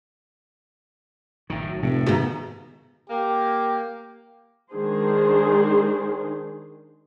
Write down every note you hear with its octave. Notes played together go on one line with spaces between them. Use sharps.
A#1 A2 D#3
F#3
F1 A2 C3
G#2 B2 D#3
A#3 G4
D#3 G#3 D4 G#4 C5